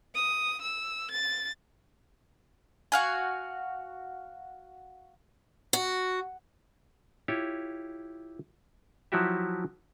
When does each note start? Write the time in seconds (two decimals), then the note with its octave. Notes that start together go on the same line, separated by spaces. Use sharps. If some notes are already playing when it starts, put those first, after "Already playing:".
0.15 D#6
0.62 E6
1.11 A6
2.92 F#4 F5 G#5
5.73 F#4
7.28 E4 F4 G4 C#5
9.12 F3 F#3 E4 F#4 G4 E5